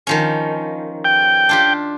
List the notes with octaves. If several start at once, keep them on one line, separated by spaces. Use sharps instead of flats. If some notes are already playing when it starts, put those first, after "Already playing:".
D#3 F3 C#4
G5
D4 F4 G4